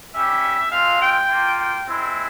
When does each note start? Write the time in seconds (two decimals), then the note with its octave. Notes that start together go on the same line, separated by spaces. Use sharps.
0.13 G3 C#4 G4 E5
0.71 G#3 C4 F4 F5
1.01 G5
1.29 A#3 F4
1.58 G5
1.87 G#3 C4 E4